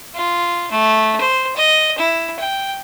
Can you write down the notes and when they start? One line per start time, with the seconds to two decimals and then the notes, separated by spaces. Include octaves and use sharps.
0.15 F4
0.71 A3
1.20 C5
1.56 D#5
1.98 E4
2.40 G5